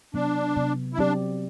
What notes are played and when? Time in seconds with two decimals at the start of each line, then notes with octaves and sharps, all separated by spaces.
0.14 C3 F#3 B3 D4
0.56 C3 F#3 B3
0.94 E4
0.98 F#3 C4 D4 G4 D5